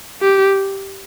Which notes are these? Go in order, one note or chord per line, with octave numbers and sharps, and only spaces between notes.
G4